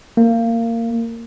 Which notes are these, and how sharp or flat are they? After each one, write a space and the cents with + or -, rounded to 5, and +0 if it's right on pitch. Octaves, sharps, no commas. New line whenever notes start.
A#3 -20